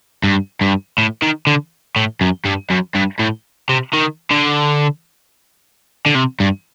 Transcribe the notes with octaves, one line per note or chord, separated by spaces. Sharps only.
G2
G2
A2
D#3
D3
A2
F#2
G2
F#2
G2
A2
C3
D#3
D3
D3
C3
G2